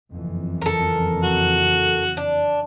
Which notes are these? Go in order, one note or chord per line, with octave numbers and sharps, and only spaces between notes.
F#1 F2 E3
A4 A#4
F#4
D4